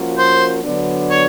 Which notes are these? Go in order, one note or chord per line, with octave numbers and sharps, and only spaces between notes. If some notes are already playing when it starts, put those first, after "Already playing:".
Already playing: F3 A#3 C#4 F#4 A#4
C5
D3 F#3 B3 D4
C#5